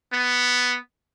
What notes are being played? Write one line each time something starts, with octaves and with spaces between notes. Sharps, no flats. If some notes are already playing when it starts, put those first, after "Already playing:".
B3